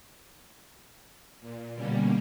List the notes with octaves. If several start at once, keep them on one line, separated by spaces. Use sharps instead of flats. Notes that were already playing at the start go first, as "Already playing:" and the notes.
A#2
B2 D3 G3 A#3 C#4